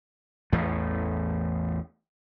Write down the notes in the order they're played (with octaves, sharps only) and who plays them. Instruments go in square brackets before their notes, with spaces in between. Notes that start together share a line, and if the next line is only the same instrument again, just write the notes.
[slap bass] A1 E2 A2 A3